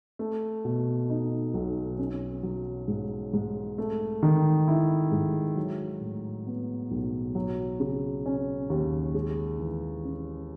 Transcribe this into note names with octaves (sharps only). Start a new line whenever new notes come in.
A3
B2
D#4
B1
C#4
F#3
G#2
G#2
A3
D#3
E4
G#2
F#3
A2
B3
B1
F#3
C#3
C#4
D#2
G#3
E3
C#4